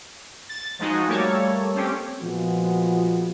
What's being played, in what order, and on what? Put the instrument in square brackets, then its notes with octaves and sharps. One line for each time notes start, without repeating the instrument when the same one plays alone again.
[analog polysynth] A6
F3 G#3 D#4 F#4
G3 A3 A#3 A4 C#5
C4 C#4 G4
[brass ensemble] A#2 F3 G#3 B3 F4 F#4